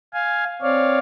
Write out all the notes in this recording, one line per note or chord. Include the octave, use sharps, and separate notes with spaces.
F5 G#5
C4 C#5 D5 F5